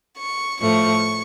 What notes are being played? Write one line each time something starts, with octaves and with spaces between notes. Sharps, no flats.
C#6
A2 F3 A3 C#6